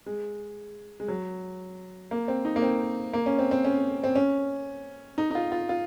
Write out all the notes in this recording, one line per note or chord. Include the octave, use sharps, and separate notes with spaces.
G#3
G#3
F#3
A#3
C4
D#4
A#3
C4
A#3
C#4
C4
C4
C#4
C4
C#4
D#4
D#4
F4
F4
F4